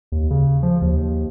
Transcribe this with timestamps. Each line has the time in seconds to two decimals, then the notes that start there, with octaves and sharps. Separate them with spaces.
0.12 D#2
0.30 C#3
0.63 F3
0.82 D#2